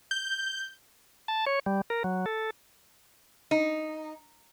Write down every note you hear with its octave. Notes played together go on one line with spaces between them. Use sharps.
G6
A5
C#5
G3
A#4
F#3
A4
D#4